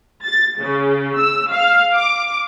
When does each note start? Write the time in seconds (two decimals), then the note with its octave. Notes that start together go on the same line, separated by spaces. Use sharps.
0.25 A6
0.61 C#3
1.18 E6
1.52 F5
1.96 D6